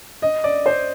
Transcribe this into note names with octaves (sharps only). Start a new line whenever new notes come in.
D#5
D5
C5